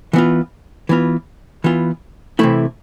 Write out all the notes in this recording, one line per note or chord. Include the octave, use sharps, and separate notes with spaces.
E3 B3 F4
E3 B3 F4
E3 B3 F4
C3 E3 A3 E4